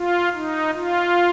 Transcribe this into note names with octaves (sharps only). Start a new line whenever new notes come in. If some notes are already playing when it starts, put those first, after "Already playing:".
Already playing: F4
D#4
F4